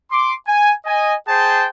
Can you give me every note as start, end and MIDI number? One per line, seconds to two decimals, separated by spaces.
0.11 0.34 84
0.11 0.34 86
0.47 0.72 80
0.86 1.15 75
0.86 1.15 80
1.28 1.67 68
1.28 1.67 72
1.28 1.67 79
1.28 1.67 81